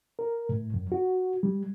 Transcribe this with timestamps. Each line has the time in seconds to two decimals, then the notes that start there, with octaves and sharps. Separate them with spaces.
0.19 A#4
0.49 A2
0.74 F#2
0.92 F#4
1.43 G3